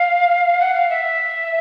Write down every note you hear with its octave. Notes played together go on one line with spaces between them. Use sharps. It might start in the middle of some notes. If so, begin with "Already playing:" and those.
Already playing: F5
F#5
F5
E5